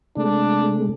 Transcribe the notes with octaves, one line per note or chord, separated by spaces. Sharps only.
C3 G#3 A3 D4